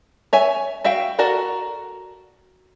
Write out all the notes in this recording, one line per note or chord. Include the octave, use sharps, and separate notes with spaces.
C#5 E5 G#5
F#4 E5 F5 G5
F#4 A4 A#4 D5 F#5